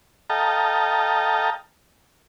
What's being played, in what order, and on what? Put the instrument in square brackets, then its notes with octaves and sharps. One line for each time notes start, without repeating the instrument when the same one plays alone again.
[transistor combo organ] A4 D#5 F5 G5 A5 A#5